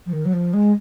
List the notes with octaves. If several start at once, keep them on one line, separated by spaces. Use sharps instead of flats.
F3
D#3
F#3
F3
G#3